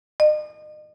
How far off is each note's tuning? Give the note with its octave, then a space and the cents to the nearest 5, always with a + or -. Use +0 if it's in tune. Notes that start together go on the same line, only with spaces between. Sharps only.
D#5 -35